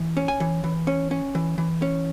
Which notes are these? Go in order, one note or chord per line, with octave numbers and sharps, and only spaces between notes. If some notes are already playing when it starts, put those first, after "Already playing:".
Already playing: E3
C#4
G#5
E3
E3
C#4
C#4
E3
E3
C#4